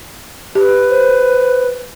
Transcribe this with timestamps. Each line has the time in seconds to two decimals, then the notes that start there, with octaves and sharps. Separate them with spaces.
0.55 G4 B4
0.90 C5